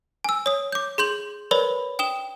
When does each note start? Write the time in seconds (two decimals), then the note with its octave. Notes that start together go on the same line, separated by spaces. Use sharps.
0.24 G#5 E6
0.46 C#5 D#6
0.72 D6 G6
0.98 G#4 C6 G6 F#7
1.51 A#4 B4 C#5 D5 B5
1.99 G5 D#6 E7 G7